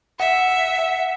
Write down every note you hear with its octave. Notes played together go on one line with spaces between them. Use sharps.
E5 F#5